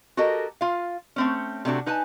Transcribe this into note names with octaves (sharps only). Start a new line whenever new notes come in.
F#4 G4 A4 A#4 D#5
F4 F5
A3 C4 C#4
C3 A3 D4 F#4
D#4 B4 G#5 A5